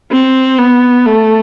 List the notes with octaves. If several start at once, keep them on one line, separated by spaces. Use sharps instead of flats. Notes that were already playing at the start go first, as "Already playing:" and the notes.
C4
B3
A3